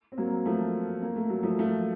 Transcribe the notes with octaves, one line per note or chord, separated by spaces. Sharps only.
C4
F#3 A#3
F3 A3
A#3
A3
F#3
F3 A3
F3 A3